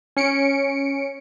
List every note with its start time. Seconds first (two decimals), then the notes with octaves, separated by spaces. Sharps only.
0.17 C#4 C#7 D7